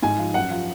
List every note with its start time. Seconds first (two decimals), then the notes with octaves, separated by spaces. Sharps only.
0.02 G#2 G#5
0.18 F3
0.34 F#2 F#5
0.51 F3